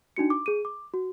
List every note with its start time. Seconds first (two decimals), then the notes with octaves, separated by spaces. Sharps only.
0.16 D4 D#4 F#4 C#7
0.30 D6
0.46 G#4 D#7
0.65 D6
0.94 F#4